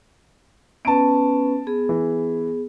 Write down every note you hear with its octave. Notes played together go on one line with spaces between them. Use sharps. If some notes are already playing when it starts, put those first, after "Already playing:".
B3 C#4 B4 A5 D7
B3 G#4
E3